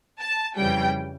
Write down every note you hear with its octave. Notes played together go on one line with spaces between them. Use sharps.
A5
F2 C#3 E3 G3 G5